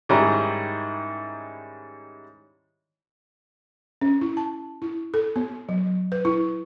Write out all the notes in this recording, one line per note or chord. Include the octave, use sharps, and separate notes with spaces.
G#2 D#3 G3 C#4 E4 A#5
C#4
E4
A5
E4
A4
B3
F#3
B4
E4